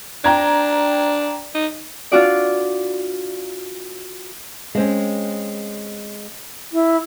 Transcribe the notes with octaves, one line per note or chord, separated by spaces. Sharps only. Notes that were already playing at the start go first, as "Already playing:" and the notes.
D4 G5 A#5 G#6
D#4
D4 F4 F#4 D5
G#3 C4 C#4
E4